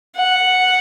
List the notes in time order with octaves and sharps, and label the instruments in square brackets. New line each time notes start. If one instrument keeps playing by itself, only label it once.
[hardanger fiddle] F#5